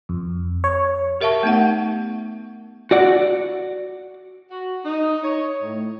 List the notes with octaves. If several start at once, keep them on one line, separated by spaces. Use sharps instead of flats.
F2
C#5
G4 A#4 E5 F5 A5 C#6
A3 B3 D#4 F#5
F#4 D5 F#5
F#4
D#4
C#5
A2